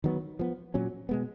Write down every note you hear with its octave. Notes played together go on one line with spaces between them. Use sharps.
D#3 F#3 B3
F3 B3
A#2 F#3 C#4
B2 G#3 B3